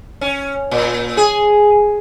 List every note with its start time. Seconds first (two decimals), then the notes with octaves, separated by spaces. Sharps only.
0.21 C#4
0.71 A#2
1.17 G#4